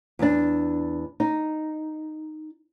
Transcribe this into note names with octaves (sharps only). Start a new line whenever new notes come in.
E2 D4
D#4